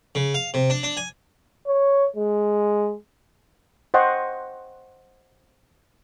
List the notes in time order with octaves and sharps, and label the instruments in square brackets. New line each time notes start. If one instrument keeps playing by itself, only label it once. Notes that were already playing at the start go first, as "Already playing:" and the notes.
[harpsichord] C#3
F5
C3
D4
D4
G#5
[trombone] C#5
G#3
[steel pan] C5 D#5 F#5 G5 C6 C#6